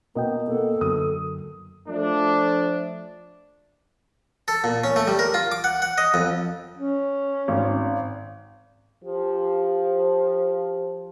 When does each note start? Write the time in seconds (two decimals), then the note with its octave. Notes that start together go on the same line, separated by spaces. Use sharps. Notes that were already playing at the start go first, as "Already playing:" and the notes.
0.15 B2 A#3 B3 A#4 D#5 G5
0.47 A#3 B3 A4
0.81 F#2 D3 F#3 D#6
1.88 F3 A3 D4
4.48 A4
4.64 A#2
4.84 C#4
4.96 A3
5.08 G3
5.19 A#4
5.34 F4
5.52 D6
5.64 F#5
5.82 F#5
5.98 D#5
6.14 F2
6.77 C#4
7.48 G#1
9.04 F3 G4